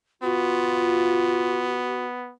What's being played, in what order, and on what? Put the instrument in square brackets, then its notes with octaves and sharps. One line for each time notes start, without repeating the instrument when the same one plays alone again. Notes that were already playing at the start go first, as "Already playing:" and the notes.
[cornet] B3 [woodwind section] F4 [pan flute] F#4